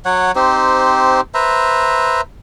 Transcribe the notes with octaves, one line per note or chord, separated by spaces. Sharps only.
F#3 C#5 F#5
C4 D#4 G4 C5
B4 C5 E5 A#5